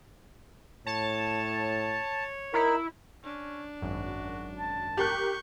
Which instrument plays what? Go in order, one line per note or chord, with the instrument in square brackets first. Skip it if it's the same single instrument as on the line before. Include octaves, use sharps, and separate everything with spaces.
[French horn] A2 [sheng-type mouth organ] C#5 [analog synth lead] A5
[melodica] D#4 B5 [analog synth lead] E4 [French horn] A#4
[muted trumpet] C#4 [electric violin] D4
[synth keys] G#1 F#2 [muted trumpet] F#4
[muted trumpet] A5
[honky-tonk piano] G4 A#4 F#6 [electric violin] C#6 G6